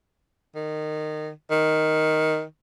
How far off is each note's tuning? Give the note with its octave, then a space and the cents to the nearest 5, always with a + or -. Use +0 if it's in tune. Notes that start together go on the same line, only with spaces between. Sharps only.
D#3 -20
D#3 +5